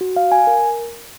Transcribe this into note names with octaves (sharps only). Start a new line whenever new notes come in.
F#4
F5
G#5
A#4